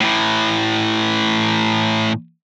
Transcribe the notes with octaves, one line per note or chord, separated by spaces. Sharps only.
A2 E3